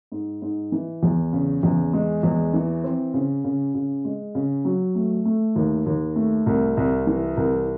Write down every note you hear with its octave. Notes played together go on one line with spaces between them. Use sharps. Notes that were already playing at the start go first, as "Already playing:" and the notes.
G#2
G#2
E3
E2
C#3
E2
G#3
E2
E3
C4
C#3
C#3
C#3
G#3
C#3
F#3
A3
A3
D#2
D#2
A3
C2
C2
E3
C2